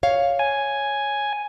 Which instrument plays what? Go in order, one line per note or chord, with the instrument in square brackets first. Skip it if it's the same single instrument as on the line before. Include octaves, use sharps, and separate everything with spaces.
[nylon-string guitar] C#5 F5
[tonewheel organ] G#5